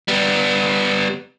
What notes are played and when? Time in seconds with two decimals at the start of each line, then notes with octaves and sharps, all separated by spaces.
0.08 G3 B3